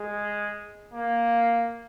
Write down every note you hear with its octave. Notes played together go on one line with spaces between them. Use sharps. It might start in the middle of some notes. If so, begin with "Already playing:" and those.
Already playing: G#3
A#3